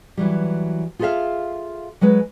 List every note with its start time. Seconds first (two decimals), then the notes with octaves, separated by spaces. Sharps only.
0.17 E3 F#3 G3
0.99 F4 G#4 A4 C5 E5 F5
2.01 F#3 G#3 B4